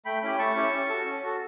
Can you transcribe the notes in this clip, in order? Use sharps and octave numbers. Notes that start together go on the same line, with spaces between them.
A3 G5 B5
C#4 E4 G4 G5 B5
A3 A5 C#6
C#4 E4 G4
C#4
F#4 A4
C#4
F#4 A4